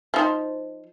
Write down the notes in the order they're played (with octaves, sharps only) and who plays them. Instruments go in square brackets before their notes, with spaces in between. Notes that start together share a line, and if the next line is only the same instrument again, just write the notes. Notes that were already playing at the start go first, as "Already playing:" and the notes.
[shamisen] F3 D#4 C5